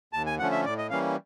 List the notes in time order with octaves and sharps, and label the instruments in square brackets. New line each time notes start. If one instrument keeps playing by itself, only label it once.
[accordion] D#2 A5
G#5
D3 F3 A3 C#4 F#5
E5
A2 D5
D#5
E3 G3 A#3 C#4 F5